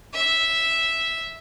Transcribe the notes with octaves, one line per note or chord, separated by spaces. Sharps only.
E5